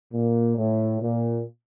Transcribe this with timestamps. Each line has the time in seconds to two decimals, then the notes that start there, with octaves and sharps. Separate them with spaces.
0.12 A#2
0.57 A2
1.02 A#2